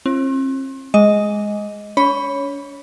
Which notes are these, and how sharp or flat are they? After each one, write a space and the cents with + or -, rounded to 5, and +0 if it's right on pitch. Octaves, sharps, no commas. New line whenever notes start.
C4 +40 F4 -40
G#3 +0 D#5 +10
C#4 +45 C#5 +0 B5 +0